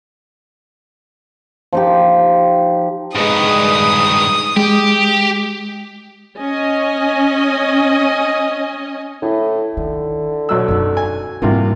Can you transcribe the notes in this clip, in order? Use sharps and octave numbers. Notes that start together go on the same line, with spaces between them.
F3 D#4 G4
G2 D#3 G#3 B4 D#6
G#3 G4 G5
C#4 D#5 G#5
A2 E4
D3 D#3
B1 F#3 E6
F#2 D#4
G#5
G#2 C3 E3 G3 A#3 D4 F4 F#4